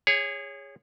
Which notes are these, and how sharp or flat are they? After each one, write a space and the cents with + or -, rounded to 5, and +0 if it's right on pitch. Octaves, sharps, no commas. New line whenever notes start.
G#4 -25 C#5 +5